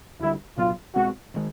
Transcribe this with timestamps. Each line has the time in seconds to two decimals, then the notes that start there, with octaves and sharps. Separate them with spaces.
0.20 D2 D3 G3 E4
0.57 C2 A#2 F#3 B3 F4
0.95 B1 B2 G#3 C4 F#4
1.34 C3 D#3 G#3